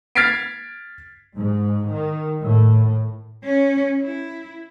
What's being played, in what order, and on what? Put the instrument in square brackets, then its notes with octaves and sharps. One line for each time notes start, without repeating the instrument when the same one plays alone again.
[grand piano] F6 G#6 A6 B6 C7 D7
[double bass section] G#2
D#3
A2
[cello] C#4
E4